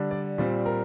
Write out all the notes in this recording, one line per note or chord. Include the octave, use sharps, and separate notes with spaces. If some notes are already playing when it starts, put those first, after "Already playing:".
Already playing: D3 G3 D4
D5
A#2 G3 C4
A#4